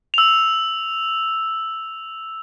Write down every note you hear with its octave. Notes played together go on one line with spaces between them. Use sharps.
E6 F7